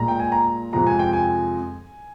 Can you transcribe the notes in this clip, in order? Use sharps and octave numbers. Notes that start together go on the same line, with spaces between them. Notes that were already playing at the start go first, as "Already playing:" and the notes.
Already playing: A#2 G#3 A#5
G5
G#5
A#5
F2 C3 F3 G#3 A#5
G#5
G5
G#5